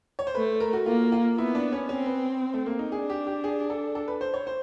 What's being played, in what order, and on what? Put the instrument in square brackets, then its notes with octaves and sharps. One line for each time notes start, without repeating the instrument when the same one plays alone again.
[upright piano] C#5
C5
[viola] A3 [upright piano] B4
[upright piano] A#4
F#4
[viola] A#3 [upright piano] F4
[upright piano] F4
[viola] B3 [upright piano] E4
[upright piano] D4
C#4
[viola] C4 [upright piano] C#4
[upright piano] B3
A3
A#3
D#4
[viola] D4 [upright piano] G#4
[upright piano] G4
G4
G#4
A4
A4
B4
C5
C#5
C5